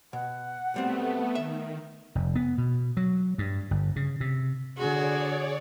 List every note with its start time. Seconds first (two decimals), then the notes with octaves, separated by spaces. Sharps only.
0.13 B2 F#5
0.74 B1 G3 A3 B3 C4
1.35 D#3 E5
2.15 F1
2.35 B3
2.58 B2
2.97 F#3
3.38 G2
3.71 G1
3.96 C#3
4.21 C3
4.78 D3 F#4 G#4 C#5 D5